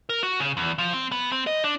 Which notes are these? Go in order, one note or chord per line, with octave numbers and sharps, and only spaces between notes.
A#4
F#4
C#3
E2
F3
C4
B3
C4
D#5
D4